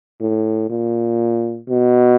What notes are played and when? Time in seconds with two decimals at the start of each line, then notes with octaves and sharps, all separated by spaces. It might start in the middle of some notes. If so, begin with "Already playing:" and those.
0.21 A2
0.70 A#2
1.69 B2